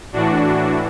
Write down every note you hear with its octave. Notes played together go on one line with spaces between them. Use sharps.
A2 E3 D4 F#4